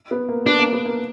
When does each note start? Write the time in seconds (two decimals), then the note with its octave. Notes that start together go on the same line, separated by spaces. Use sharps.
0.11 B3
0.29 A#3
0.46 B3 D4
0.59 A#3
0.73 B3
0.85 A#3